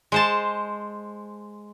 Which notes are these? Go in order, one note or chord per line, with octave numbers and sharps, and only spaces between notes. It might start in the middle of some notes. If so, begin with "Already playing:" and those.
G#3 C5 A5